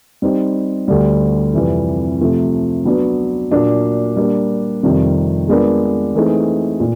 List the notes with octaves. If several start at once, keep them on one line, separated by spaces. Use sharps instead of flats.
G3 C4 D#4
D2 D3 G3
F2 C3 E3 G3
C3 F3 A3
F#3 B3 D4
A#2 F#3 A#3 D4
G3 A#3 D4
F2 C3 D#3 G3
G#3 B3 D4 F4 A#4
E3 A3 C4 D#4 G#4
A#2